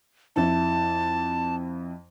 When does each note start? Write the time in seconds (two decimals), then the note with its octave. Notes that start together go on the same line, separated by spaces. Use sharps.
0.36 F2 E4 A5